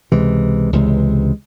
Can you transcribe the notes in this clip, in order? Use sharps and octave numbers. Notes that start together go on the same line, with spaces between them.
C#2 C3 E3 G#3
C#2 C3 E3 G#3